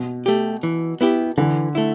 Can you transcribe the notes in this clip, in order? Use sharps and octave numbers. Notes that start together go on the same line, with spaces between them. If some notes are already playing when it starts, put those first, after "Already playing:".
Already playing: B2
A3 G4
E3
B3 E4 G4
D3 E3
A3 E4